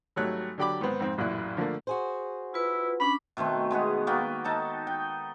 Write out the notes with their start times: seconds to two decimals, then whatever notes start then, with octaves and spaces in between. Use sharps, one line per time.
0.16 G#1 F#3 G3 A3 C#5 F#6
0.58 D3 F#3 G4 D5 B5 D6
0.81 G#2 D#3 B3 C4
1.00 F2 G#2 C4
1.18 A1 F#2 A#2 E4 F#6
1.57 D3 F3 A3 A#3
1.87 F#4 G#4 C5
2.54 E4 F4 B4
3.00 C#4 D4 B5 D6
3.37 B2 D#3 A3 C4
3.71 G#3 B3 G#4 F#5
4.07 A#3 B3 F#4 G5
4.44 D#4 A4 A5
4.87 G5